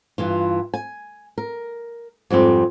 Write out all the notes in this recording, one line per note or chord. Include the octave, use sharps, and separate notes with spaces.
G2 E3 F4
G#5
A#4
F2 G#2 G3 C4